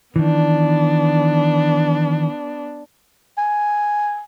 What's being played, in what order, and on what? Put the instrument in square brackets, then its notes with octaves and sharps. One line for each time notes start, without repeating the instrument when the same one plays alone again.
[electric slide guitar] D#3 E3 [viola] B3 D4
[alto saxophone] G#5